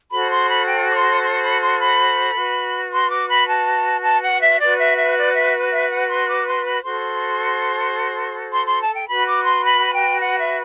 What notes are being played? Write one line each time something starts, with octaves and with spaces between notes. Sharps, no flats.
F#4 A4 C5 B5
C6
B5
G5
D6
C6
C6
B5
C6
B5
F#4 B4
C6
D6
B5
A5
A5
F#5
E5
F#4 B4 D5
E5
E5
D5
E5
E5
F#5
C6
D6
C6
B5
F#4 A4 C5 C6
C6
C6
A5
G5
F#4 B4 B5
D6
C6
B5
G5
F#5
E5